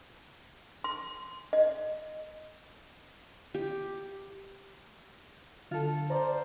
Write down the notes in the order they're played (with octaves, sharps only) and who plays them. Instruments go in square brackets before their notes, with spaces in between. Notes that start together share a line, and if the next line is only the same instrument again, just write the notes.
[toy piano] C6
D#5
[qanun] G4
[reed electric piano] D3 [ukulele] F4 A4
[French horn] C5 [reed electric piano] D5 A#5